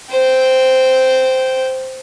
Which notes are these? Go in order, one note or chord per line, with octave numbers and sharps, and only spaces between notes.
C5 G5